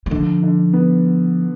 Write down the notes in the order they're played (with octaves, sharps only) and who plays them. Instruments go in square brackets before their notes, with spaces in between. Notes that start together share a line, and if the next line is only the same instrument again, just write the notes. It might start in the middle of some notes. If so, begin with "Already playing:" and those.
[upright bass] G3
[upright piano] D3 [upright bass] F3
[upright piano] D3
B3